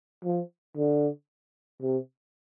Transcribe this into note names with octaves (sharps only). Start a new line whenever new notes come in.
F3
D3
C3